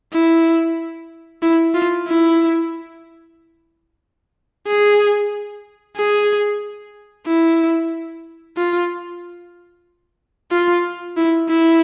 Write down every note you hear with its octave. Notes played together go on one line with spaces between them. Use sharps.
E4
E4
F4
E4
G#4
G#4
E4
F4
F4
E4
E4